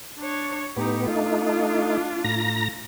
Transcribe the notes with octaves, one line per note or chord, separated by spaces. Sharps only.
D4 C#5
A2 B3 D#4 G4
A3 D4 D#4 F4
A2 A#5 A#6